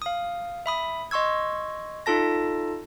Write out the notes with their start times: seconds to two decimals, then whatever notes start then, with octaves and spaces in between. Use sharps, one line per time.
0.02 F5 D#6
0.66 E5 B5 D#6
1.11 D#5 C6 C#6 E6 G#6
2.06 D#4 F4 A4 A5 A#6